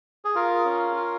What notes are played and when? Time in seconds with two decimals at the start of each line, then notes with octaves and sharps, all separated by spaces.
0.25 G#4
0.35 F4 A#4
0.65 C#4
0.96 F4